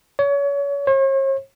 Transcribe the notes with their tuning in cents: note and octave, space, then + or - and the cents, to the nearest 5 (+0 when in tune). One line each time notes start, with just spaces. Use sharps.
C#5 +30
C#5 -45